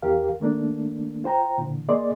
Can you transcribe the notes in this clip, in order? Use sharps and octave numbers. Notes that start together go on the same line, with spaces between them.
E2 G4 A#4 F5
D#3 A3 A#3 D4
F4 C5 G5 A#5
A#2 D3 E3
A#3 G#4 D5 D#5 C6